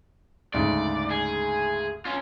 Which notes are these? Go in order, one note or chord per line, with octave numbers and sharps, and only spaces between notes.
D2 G#2 C#3 D5
G#4
C#4 F4